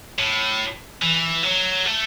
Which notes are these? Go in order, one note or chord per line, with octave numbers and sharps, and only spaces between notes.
A2
E3
F#3
A3